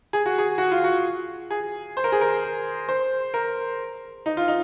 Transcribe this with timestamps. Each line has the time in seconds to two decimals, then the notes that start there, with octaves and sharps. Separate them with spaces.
0.13 G#4
0.26 F#4
0.38 G#4
0.58 F#4
0.71 F4
0.84 F#4
1.50 G#4
1.97 C5
2.04 A#4
2.12 G#4
2.21 A#4
2.89 C5
3.34 A#4
4.26 D#4
4.37 F4
4.48 D#4